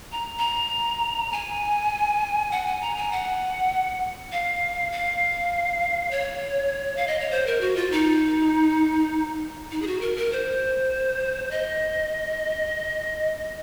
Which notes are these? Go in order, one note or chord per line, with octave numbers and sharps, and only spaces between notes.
A#5
A#5
G#5
F#5
G#5
A#5
G#5
F#5
F5
F5
C#5
F5
D#5
C#5
C5
A#4
F#4
F4
D#4
D#4
G#4
F#4
A#4
A#4
C5
D#5